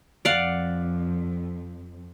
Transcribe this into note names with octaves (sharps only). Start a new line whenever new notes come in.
F2 D5 F5 F#5